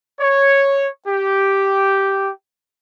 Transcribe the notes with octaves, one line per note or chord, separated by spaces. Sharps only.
C#5
G4